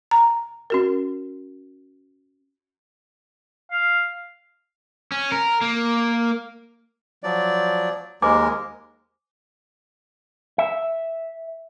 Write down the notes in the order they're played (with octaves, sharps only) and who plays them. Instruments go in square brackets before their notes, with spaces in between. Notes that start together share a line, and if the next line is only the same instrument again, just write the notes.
[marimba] A#5
C#4 F#4 A#4
[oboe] F5
[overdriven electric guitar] C#4
A#4
A#3
[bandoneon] F3 F#3 D5
[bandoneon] D#2 G#3 A#4 [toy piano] C5 G#5 D6
[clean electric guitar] E5